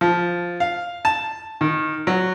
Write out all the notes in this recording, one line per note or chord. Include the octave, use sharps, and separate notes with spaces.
F3
F5
A5
D#3
F#3